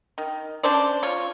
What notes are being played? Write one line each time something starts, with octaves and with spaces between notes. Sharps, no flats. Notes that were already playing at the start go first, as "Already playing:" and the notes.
D#3
C#4 D4 C5 D5
F4 C#5